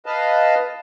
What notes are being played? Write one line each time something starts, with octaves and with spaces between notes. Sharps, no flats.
B4 D#5 F5 A5